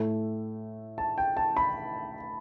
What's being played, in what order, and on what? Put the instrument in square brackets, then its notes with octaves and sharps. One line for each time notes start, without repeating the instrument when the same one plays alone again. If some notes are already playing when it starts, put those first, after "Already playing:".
Already playing: [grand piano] A2 A3
A5
G5
A5
B5